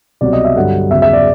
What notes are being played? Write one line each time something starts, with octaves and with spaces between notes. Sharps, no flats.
C2 B2 F#3 D5
D#5
E5
G2 D3 F#3 F#5
E2 C#3 F#3 E5
E5
D5